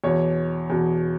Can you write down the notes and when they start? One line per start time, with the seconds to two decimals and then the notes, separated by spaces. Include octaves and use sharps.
0.04 E2 B2 C#5
0.70 E2 B2